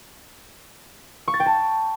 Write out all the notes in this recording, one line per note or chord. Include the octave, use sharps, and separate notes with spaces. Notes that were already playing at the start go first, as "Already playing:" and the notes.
C#6
A6
G5
A5